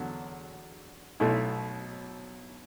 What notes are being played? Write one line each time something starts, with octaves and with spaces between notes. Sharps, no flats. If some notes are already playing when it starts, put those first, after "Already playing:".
Already playing: E2 D3 F#3
B1 B2 A3 E4